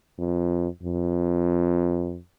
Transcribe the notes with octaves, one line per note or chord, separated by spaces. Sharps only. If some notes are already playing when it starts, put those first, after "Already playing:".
F2
F2